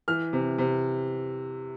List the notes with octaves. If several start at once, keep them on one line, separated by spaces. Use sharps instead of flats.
E3 F6
C3
C3